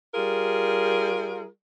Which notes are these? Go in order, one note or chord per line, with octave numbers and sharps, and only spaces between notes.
G3 F4 G#4 A#4